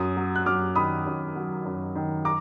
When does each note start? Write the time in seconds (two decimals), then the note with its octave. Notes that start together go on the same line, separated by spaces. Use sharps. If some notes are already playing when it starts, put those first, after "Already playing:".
Already playing: F#2 D#6
0.17 F#3
0.35 F#6
0.46 F#2 D6 F6
0.75 D#3 B5 D#6
1.06 F#2
1.36 F#3
1.65 F#2
1.95 D#3
2.25 A#5 D6